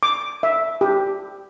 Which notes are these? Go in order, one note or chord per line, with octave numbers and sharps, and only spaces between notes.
D6
E5
G4